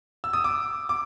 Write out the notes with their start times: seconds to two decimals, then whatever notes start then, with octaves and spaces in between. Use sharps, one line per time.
0.24 E6
0.33 D#6
0.44 D6
0.89 D6